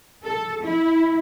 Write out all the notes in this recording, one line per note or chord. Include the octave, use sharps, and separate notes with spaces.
A4
E4